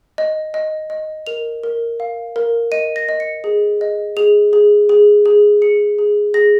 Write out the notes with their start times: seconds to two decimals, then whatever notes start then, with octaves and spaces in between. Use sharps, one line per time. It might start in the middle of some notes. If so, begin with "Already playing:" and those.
0.18 D#5
0.54 D#5
0.90 D#5
1.27 A#4 F7
1.63 A#4
2.00 F5
2.36 A#4
2.72 D#5 D#7
2.96 A#6
3.09 D#5
3.20 C#7
3.44 G#4
3.81 D#5
4.17 G#4 F7
4.53 G#4
4.89 G#4
5.26 G#4
5.62 G#4 C#7
5.99 G#4
6.34 G#4 A#6